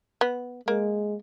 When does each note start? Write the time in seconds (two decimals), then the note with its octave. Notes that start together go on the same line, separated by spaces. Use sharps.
0.21 B3
0.68 G#3 A#3